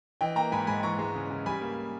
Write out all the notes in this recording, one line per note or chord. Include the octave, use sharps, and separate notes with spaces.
E3 D#5 G5
A#3 G5 A#5
G#2 G#5 B5
G#2 G#5 B5
E3 A#5 C#6
G#3
C#3
C#3
G3 G#5 B5
A#3